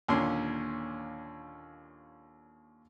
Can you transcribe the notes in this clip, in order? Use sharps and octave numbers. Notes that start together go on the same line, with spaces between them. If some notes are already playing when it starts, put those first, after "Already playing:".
D#2 A#2 D3 C#4 C6